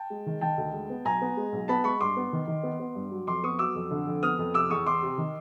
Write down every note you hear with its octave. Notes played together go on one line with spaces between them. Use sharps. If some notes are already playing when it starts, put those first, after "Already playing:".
Already playing: G5 A5
G#3
D#3
D#3 G5 A5
D2
G#3
B3
B1 G#5 A#5
B3
G#3
B1
B3 A5 B5
G#3 B5 C#6
G2 C6 D6
B3
D#3
D#3
B3
B3
G2
F#3
F2 C6 D6
B3 C#6 D#6
F#3 D6 E6
F2
D3
F2
B3 D#6 F6
F2
C3 D6 E6
E2 C#6 D#6
E2 C6 D6
C3
D#3